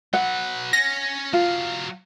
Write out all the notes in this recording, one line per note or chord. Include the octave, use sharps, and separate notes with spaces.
F#3 B4 F#5
C#4 A#6
F#3 F4 F5